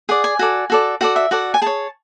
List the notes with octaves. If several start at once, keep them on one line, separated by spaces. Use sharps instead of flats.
G#4 D5 F#5
G#5
F#4 A4 D5
F#4 A4 D5
F#4 A4 D5 F#5
E5
F#4 A4 D5 F#5
G#5
G#4 C#5 A5